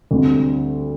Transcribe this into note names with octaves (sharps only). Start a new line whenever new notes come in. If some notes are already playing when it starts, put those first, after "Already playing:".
D2 D3 G3 C4